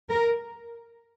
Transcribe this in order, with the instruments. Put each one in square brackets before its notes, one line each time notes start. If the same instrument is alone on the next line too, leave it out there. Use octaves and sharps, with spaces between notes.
[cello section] A#4